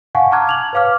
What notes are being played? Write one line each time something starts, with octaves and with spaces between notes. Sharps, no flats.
F5 F#5 G#5 A5 C#6
A5 A#5 D6 F6 F#6 G#6
G#6 F7 F#7
B4 C#5 F5 D6 F6